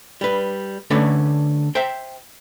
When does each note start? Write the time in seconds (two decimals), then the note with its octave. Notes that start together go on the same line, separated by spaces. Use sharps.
0.21 G3 B4
0.90 D3 A3 C#4 A4 B4 D5
1.75 C5 E5 G5